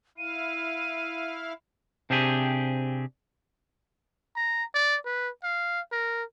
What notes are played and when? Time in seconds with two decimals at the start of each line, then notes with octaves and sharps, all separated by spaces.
0.18 E4 F5 D#7
2.10 C3 C4 D4 G4 G#4
4.36 A#5
4.74 D5
5.05 B4
5.44 F5
5.92 A#4